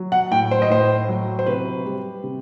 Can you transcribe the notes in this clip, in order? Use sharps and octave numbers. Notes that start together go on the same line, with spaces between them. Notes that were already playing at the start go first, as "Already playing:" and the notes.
Already playing: F#3
F#5
A2 G5
C5
D#5
A2 C5
F#3
C5
C3 B4
G3
C3